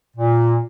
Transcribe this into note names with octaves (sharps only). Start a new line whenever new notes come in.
A#2